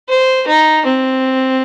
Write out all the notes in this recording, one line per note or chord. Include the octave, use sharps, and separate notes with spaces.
C5
D#4
C4